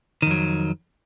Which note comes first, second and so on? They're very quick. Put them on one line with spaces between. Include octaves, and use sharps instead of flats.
D#3 F2 F#3